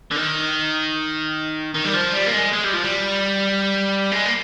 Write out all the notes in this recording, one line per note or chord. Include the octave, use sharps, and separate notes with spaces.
D3
D#3
D#3
G3
F3
G3
A#3
G#3
G#3
G3
F3
G3
G#3
A#3